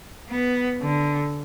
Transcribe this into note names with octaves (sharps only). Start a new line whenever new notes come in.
B3
D3